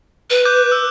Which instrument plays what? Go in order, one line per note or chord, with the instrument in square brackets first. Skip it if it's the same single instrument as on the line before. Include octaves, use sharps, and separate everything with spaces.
[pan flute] B4
[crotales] D6 F#6 G6
E6